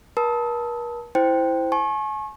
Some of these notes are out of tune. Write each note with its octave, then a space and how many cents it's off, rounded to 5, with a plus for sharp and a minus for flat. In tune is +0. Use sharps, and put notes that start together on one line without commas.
A#4 +45 A5 +0 D#6 +40
E4 +0 C5 -10 G5 +0
G#5 +45 C#6 -30